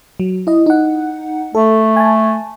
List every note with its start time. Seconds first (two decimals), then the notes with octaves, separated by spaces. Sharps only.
0.20 F#3
0.47 E4 D#5
0.66 D#4 F#5
1.55 A3 A4
1.96 G#5 A5